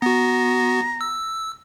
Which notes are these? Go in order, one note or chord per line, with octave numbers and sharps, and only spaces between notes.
B3 F#4 A#5
E6